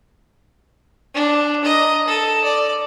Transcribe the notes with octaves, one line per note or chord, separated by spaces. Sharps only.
D4
D#5 A#5
A4
D5